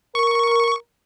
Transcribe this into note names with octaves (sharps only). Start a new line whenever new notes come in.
A#4 C#6